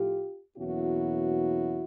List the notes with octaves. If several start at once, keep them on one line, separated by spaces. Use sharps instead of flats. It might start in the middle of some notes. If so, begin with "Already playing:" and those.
Already playing: A2 F3 A3 F4 G4
E2 B2 F#3 A#3 C#4 E4 F#4